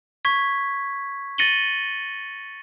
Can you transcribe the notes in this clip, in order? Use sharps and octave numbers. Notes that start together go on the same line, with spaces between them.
C#6 G#6 B6
A6 A#6 C#7 D#7 F#7 G7